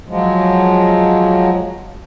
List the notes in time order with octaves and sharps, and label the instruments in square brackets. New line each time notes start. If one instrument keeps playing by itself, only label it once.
[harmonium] F3 F#3 G#3